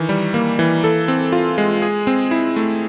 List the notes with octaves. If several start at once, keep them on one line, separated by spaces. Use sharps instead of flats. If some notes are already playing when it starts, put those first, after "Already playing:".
Already playing: D#3 E3
G3
A#3
E3
A4
C4
F4
G#3
G#4
C4
E4
A3